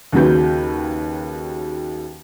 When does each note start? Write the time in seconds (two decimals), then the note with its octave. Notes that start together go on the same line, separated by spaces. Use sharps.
0.12 D#2 C#3 F#3 F#4 B4 G6